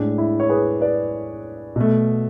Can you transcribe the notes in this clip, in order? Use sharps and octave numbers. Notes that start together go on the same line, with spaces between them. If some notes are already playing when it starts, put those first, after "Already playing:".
Already playing: A2 G#3 D4
E4
C#5
G#4 B4
B4 D5
B2 A3